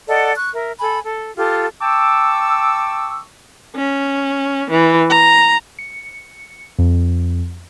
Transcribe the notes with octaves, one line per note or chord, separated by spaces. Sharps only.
A4 D5 D#5 F#5
C#6 F#6
A#4 E5
A4 G#5 B5
A4
F4 G4 A4
G5 A5 C#6 D6 E6
C#4
E3
A#5
C#7
F2